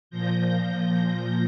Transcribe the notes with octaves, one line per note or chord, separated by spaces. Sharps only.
A#2 F3 G6 A#6